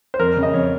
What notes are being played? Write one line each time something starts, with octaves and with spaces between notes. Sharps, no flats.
C5
F2 A#4
C#3
D#5
F2 C#5